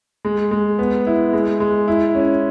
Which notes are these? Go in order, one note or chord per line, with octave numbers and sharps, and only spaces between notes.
G#3
G#3
B3
E4
G#3
G#3
E4
C#4